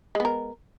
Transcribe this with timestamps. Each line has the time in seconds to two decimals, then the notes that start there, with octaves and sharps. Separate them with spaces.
0.15 G#3
0.20 B3
0.25 A#4